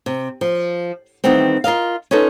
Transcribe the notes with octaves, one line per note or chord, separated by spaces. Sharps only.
C3
F3
D#3 E3 G3 A3 B3 C4
F4 A#4 D#5 F5
C#4 D#4 F4 A4 B4